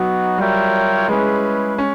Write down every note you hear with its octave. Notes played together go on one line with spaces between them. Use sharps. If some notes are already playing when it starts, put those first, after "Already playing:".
Already playing: F#3 B3 D#4 F#4
G3 F4 A#4 C#5 E5 G5
G#3 C#4 E4 G#4 B4
C#4